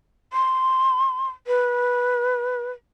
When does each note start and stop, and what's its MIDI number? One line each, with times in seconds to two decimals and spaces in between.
0.33 1.27 84
1.47 2.71 71